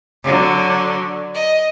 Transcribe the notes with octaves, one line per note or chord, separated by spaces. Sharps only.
D3 F#3
D#5